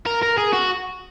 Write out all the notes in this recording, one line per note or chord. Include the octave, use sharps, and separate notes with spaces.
A#4
A#4
G#4
F#4